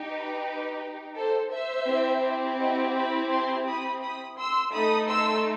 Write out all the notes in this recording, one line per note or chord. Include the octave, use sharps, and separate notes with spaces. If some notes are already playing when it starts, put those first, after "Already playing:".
Already playing: D#4 G4
B4
A4 C5
C5 E5
C4 E4 G4
D#5 F#5
G5 B5
A5 C6
B5 D#6
B5 D#6
C6 E6
A3 D#4 A4 B5 D#6
C6 E6